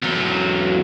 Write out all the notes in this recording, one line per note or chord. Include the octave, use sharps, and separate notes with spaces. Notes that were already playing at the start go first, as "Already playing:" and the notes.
E2 F#3